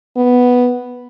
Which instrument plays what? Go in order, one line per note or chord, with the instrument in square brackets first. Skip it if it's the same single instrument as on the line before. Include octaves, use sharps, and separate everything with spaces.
[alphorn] B3